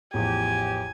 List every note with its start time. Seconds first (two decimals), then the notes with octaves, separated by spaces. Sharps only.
0.14 A1 E2 F3 G4 G#5